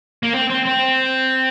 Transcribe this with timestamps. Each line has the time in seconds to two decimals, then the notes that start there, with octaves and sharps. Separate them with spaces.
0.23 A#3
0.33 C4
0.50 C4
0.66 C4